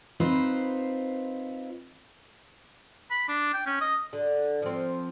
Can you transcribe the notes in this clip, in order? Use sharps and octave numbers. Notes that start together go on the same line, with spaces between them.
C4 D#4 F4 B4 C5
B5
D4
G5
C#4
D#5
D3
F3 C4